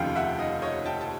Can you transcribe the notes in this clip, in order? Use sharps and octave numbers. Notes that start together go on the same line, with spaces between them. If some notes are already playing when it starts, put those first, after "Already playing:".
Already playing: F1 D#2 C#3 F3 F5 G5
E5 F#5
D#5 F5
C#5 D#5
G5 A5
A5